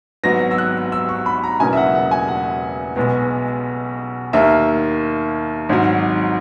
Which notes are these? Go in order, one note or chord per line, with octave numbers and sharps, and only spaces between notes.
G#1 G#2 F#3 B3 A#6
E6
F#6
E6
C#6
B5
A#5
E1 E2 C#3 F#3 A#3 G#5
E5
F#5
F#5
G#5
F#5
B1 B2 G#3 B3
D#2 D#3 A#3 E5
G#1 G#2 D#3 F#3